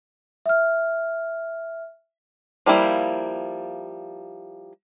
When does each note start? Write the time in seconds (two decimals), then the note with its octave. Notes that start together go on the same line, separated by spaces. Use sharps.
0.46 E5 F6
2.66 F3 G3 A#3 E4